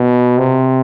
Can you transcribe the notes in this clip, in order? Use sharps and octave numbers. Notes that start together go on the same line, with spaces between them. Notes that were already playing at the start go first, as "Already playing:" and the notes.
Already playing: B2
C3